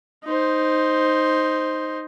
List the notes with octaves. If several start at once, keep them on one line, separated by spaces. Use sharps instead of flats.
D#4 C5